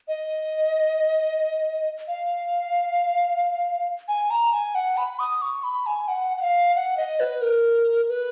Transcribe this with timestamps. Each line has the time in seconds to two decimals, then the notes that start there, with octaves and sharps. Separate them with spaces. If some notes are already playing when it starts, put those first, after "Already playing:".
0.08 D#5
2.08 F5
4.08 G#5
4.30 A#5
4.53 G#5
4.75 F#5
4.97 B5
5.19 D#6
5.42 C#6
5.64 B5
5.86 G#5
6.08 F#5
6.37 F#5
6.42 F5
6.75 F#5
6.97 D#5
7.20 B4
7.41 A#4
8.09 B4